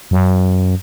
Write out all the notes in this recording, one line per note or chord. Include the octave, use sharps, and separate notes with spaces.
F#2